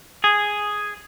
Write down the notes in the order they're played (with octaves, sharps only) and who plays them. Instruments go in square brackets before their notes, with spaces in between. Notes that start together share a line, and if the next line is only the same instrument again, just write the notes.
[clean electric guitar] G#4